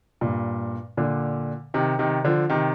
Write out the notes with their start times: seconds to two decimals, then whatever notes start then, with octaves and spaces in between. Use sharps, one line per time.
0.21 G2 A#2
0.97 A#2 D3
1.74 C3 D#3
1.99 C3 D#3
2.24 D3 F3
2.50 C3 D#3